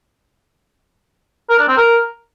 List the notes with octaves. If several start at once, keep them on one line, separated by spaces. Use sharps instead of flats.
A#4
D4
C4
A#4